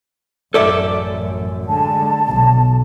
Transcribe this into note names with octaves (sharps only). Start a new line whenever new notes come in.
A1 F#2 A4 D5 E5
D3 G#3 A5
B1